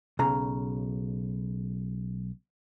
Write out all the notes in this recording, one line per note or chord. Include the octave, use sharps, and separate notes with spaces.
B1 C#3 A#5